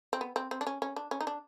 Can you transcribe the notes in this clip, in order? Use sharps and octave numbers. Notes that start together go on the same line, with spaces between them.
C4
B3
C4
C4
D4
C#4
C#4
D4
C#4
D#4
D4